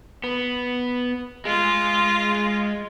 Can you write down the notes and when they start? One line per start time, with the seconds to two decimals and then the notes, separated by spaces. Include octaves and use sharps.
0.24 B3
1.45 G#3 F4